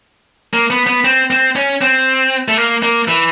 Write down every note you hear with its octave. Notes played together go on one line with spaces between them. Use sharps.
A#3
B3
B3
C4
C4
C#4
C4
A3
A#3
A#3
E3